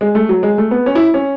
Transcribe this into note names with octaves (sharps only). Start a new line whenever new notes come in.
G#3
A3
F#3
G#3
A3
B3
C#4
E4
C#4